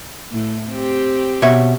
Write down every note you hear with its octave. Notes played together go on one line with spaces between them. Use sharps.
A2
C4 G4
B2 C#5 E5